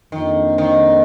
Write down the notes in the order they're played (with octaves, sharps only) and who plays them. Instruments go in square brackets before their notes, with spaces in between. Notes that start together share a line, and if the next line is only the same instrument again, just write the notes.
[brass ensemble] F2 F3 A#3 D4 [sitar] D#3
[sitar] D#3